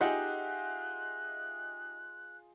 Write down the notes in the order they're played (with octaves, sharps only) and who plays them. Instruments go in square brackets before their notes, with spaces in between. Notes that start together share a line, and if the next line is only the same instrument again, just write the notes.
[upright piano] D#4 G4 E5 [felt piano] F4 G#4 D#5 [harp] F#5 [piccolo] F#6